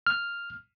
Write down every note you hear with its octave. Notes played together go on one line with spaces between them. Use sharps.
F6